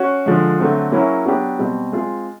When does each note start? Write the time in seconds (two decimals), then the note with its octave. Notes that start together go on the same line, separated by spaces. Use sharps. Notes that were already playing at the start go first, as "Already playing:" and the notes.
Already playing: C#4 F#4
0.26 D3 F3 G#3
0.60 D3 F#3 A3 C4
0.92 F#3 A#3 C#4 E4 G#4
1.26 F#3 B3 D4 G4
1.59 B2 G3 C4
1.92 G#3 C4 F4 G#4